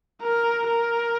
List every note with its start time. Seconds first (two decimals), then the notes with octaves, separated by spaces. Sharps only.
0.22 A#4
0.68 A#4